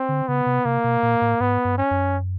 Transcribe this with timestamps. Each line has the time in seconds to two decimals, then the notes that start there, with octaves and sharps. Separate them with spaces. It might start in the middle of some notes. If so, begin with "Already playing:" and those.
Already playing: C4
0.09 D3
0.28 C#3 B3
0.46 C3
0.65 C3 A#3
0.84 B2
1.03 A#2
1.21 A2
1.40 G#2 B3
1.65 G2
1.78 C#4
1.91 F#2